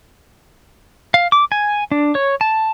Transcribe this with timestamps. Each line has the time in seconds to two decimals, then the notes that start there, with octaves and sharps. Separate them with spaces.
1.14 F5
1.32 D6
1.52 G#5
1.92 D4
2.15 C#5
2.41 A5